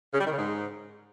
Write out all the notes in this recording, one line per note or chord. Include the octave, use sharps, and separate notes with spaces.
C#3
G3
D#3
C#3
G#2